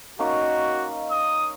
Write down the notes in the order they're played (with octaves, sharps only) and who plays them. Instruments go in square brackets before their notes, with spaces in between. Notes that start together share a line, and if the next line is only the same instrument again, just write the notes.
[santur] A#3 C#4 D#4 [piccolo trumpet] F#4
[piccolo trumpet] D#6